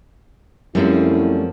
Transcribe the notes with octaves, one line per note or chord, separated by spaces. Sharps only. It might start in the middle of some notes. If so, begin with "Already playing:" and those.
F#2 F3 G3 A3 C4 C#4 E4 G#4